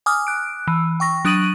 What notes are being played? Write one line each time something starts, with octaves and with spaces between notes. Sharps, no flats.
G#5 D6 D#6 F6
F#6 D7
E3
G5 C#6 A#6
F#3 D4 D#6 A#6 D#7 F#7